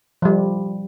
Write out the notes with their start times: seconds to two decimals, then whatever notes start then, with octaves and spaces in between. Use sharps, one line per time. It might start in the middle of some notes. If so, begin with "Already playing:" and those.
0.22 F3 G3